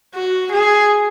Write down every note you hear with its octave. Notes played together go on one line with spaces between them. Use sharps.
F#4
G#4